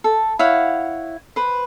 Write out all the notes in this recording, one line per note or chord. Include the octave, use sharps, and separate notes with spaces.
A4
E4 C#5 F5 F#5
B4 C5